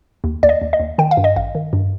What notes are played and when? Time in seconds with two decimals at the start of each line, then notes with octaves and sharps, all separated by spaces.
0.24 D#2
0.43 D#2 D5
0.49 D#5
0.62 D#2
0.73 D#5
0.80 D#2
0.98 D#3 G5
1.11 F5
1.17 G2
1.24 D#5
1.36 A1 F5
1.55 D#3
1.73 G2